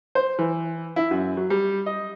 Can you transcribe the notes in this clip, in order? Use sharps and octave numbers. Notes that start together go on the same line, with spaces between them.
C5
E3
E4
F#2
F#3
G3
D#5